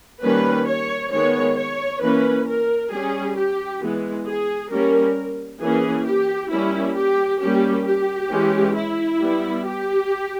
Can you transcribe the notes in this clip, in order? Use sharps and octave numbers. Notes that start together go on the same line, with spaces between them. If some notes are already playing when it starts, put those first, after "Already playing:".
D#3 G3 A#3 C#4 B4
C#5
D#3 G#3 B3 C#5
C#5
E3 A#3 C#4 B4
A#4
G3 C#4 G#4
G4
E3 G#3 B3
G#4
G3 A#3 C#4 A#4
E3 A#3 C#4 G#4
G4
G3 A#3 C#4 E4
G4
G3 A#3 C#4 G4
G4
E3 G#3 C#4
E4
G3 B3
G4